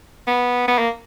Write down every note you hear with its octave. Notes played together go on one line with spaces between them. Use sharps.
B3
B3
A#3